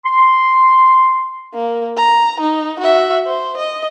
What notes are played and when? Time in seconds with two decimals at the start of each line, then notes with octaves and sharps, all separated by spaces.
0.05 C6
1.55 A#3
1.98 A#5
2.40 D#4
2.80 F#4 E5
3.26 C5
3.57 D#5